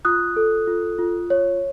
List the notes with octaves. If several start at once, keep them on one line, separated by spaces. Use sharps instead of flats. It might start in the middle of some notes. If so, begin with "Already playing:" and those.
F4 D#6 F#6
A4
F4
F4
C#5